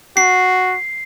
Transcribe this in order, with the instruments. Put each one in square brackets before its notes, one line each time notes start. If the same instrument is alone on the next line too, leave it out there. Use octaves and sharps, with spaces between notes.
[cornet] F#4 [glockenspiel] C7